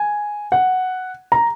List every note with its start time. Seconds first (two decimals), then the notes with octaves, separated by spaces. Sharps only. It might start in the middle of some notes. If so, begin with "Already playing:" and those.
Already playing: G#5
0.52 F#5
1.32 A#5